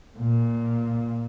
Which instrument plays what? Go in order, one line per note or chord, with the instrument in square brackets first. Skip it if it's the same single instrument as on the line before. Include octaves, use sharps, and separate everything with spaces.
[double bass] A#2